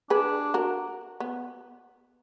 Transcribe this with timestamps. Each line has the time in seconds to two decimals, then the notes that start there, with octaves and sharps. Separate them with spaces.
0.10 D4 G#4 B4
0.54 F#4 A#4
1.20 B3